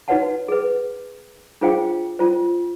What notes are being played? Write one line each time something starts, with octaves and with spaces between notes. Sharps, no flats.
D#4 F#4 B4 C#5 F#5 A5
G#4 B4
D4 F4 G#4 C5 F5 G5
C#4 F4 C5